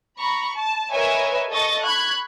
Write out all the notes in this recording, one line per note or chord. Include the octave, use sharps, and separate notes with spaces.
A#5 B5 C#6
A5
A#4 B4 C#5 D#5 E5 G#5
A4 D#5 C#6 A6
B5 C#6 F#6 G#6